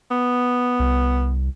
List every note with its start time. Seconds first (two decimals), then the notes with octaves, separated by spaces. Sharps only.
0.11 B3
0.79 C2